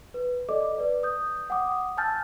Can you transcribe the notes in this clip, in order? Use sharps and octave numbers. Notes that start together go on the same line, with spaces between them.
B4
A4 D5 D#5 D6
B4 D5
D#6 G6
F#5 G5 D6 D#6
G#5 A5 E6 F6 G6 A6